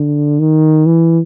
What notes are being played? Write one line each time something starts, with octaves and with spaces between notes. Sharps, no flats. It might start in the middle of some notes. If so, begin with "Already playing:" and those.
Already playing: D3
D#3
E3